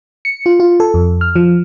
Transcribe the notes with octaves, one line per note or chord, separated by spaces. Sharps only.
C#7
F4
F4
A4
F2
F6
F3